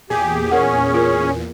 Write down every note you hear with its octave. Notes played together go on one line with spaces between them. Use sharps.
E2 A#2 G4 G#4
C#4 A#4 F#5
F4 A#4